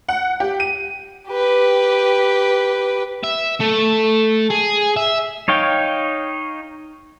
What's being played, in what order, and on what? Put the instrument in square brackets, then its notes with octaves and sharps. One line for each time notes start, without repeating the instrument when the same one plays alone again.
[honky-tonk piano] F#5
G4
D#7
[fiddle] G4 B4
[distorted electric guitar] E5
A3
G#4
E5
[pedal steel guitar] D#4 C#5 F5 G5